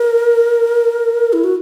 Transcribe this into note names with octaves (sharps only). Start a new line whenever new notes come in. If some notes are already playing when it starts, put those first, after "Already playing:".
Already playing: A#4
E4
F#4